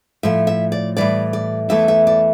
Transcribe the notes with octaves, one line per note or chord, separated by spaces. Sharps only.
A2 F3 A3 E5
E5
D5
A2 E3 G3 D5
D5
E2 E3 A3 E5
E5
D5